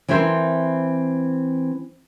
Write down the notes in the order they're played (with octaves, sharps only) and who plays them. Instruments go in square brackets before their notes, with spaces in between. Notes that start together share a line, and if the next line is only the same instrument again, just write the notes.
[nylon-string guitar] E3 C4 E4 A#4 C5